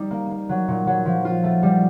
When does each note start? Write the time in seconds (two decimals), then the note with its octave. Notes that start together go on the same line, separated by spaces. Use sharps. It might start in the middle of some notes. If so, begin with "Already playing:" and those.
Already playing: G3 D#4
0.11 A#3
0.30 A#3
0.49 F#3
0.68 A#2
0.87 F#3
1.06 F3
1.25 F4
1.43 A3
1.63 G3